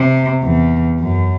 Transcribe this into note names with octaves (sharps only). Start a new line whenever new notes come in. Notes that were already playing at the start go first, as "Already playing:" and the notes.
Already playing: C3
E2
F#2